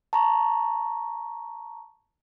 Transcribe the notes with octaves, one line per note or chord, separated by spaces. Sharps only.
A5 A#5 C#6